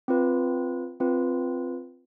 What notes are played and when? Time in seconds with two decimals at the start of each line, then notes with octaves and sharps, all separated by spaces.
0.08 C4 F4 B4
1.00 C4 F4 B4